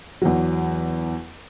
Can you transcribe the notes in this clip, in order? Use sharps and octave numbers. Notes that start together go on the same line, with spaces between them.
E2 F#3